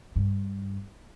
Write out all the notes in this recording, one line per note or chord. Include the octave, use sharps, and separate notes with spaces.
G2